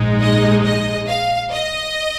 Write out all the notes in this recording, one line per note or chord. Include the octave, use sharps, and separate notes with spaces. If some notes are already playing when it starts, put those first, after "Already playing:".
Already playing: A#1 G#2 G#3 D#4
D#5
D#5
F5
D#5